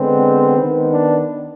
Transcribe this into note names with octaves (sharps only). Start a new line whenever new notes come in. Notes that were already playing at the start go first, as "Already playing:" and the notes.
Already playing: D3 G#3 B3 C4
D#3 B3
D4